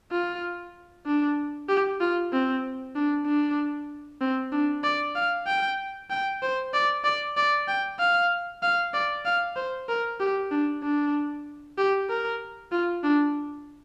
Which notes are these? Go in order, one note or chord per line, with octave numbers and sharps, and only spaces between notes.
F4
D4
G4
F4
C4
D4
D4
C4
D4
D5
F5
G5
G5
C5
D5
D5
D5
G5
F5
F5
D5
F5
C5
A#4
G4
D4
D4
G4
A#4
F4
D4